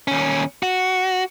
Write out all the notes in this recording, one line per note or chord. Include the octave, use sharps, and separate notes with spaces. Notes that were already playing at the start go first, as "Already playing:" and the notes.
D#2 C#4
F#4